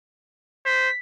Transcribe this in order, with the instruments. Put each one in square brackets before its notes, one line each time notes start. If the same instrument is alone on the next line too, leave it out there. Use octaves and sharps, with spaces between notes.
[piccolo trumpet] C5 [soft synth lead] B6